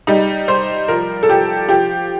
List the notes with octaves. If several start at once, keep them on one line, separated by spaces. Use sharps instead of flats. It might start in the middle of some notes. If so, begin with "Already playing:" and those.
G3 D#4
G3 C5
F3 A#4
A4
F3 G4
F3 G4